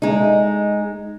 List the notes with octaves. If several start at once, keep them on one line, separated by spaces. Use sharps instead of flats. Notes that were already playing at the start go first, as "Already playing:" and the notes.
G#3 D#4